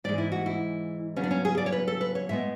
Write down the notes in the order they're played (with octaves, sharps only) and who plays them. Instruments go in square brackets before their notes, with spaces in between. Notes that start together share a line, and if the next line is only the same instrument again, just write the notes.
[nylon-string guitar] G#2 E3 G#3 D5
E4
F#4
E4
C#3 F#3 B3 C#4
D4
C#4
G#4
D5
C#5
B4
A4
B4
C#5
A2 G#3 B3 E5